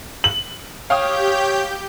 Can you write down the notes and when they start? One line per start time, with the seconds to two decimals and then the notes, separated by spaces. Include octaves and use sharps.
0.24 F#7
0.90 G4 C#5 F5 G5 D#6 G6